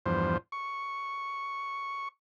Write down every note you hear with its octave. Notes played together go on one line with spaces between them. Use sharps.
E2 G2 F3 C5
C#6